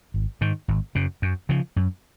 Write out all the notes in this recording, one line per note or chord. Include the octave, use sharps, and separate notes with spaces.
G#1
G#2 D#3
G#1
F#2 C#3
F#2
C#3 F3
F#2